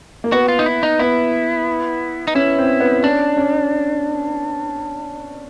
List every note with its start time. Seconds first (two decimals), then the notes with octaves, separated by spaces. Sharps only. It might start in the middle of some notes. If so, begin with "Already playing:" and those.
0.24 A#3
0.32 B3 F#4
0.48 F4
0.59 D#4
0.66 E4
0.83 D#4
0.99 B3 E4
2.28 D#4
2.35 C#4 E4
2.58 C4
2.80 B3
3.03 C#4 D4
3.37 C#4